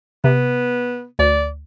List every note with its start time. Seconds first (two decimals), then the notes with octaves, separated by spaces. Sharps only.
0.24 C3 B3
1.19 D2 D5